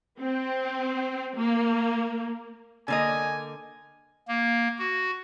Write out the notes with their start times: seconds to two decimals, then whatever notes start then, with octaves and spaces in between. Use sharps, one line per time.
0.19 C4
1.36 A#3
2.88 D3 A#3 D#5 G#5
4.28 A#3
4.79 F#4